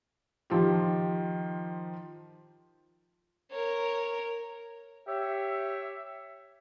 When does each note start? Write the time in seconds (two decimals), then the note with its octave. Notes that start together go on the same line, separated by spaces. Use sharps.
0.50 D#3 F3 F4 G4
3.52 A#4 C#5
5.07 G4 C#5 E5